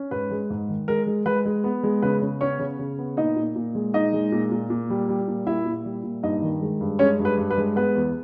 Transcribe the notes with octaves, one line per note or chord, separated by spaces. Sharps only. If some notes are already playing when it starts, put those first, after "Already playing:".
Already playing: C#4
G#2 B4
G#3
G#2
D#3
G#3 A#4
G#3
G#3 B4
G#3
B3
G#3
C#3 B4
C#3
B3 C#4 C#5
C#3
C#3
B3
A#2 D#4 D#5
A#2
A#2
G#3
A#2 D#4 D#5
G#3
A#2
A#2
A#2
G3
G3
A#2
A#2 E4 E5
A#2
G3
A#2
G2 D#4 D#5
D#3
G#3
G2
G#3 C#4 C#5
G2
B4
G2
B4
G#3
B3 B4
E2